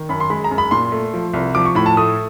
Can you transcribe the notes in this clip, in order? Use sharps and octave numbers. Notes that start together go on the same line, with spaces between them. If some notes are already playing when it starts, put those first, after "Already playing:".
Already playing: D#3
F#2 B5
C6
G#3 B5
A#5
F#2
B5
A#2 C6
A3
F3
C2
F3 D6
C#6
A2 B5
A5
A3 D#6